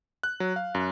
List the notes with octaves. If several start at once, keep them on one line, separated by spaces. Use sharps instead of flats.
F#6
F#3
F5
F#2